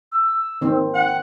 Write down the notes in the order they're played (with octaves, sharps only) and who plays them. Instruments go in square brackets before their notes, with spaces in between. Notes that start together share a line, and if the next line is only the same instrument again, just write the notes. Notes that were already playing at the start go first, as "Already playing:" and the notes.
[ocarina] E6
[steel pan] D#3 C4
[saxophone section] F#5 [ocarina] G5